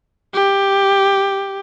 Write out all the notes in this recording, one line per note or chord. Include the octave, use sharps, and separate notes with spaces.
G4